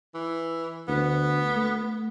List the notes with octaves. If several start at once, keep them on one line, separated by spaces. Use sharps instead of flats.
E3
D2 B3
A3